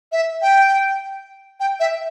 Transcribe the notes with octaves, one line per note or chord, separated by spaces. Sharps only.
E5
G5
G5
E5